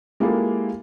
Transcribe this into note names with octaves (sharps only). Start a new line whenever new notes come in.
G#3 A#3 E4 F4 G4 A4